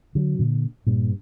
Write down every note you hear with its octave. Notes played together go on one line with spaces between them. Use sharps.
D3 F#3
A#2 D3
G2 A#2